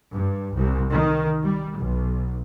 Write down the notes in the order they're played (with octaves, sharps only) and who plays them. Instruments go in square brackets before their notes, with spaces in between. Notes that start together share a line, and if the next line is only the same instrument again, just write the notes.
[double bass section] G2
C2
D#3
G3
B1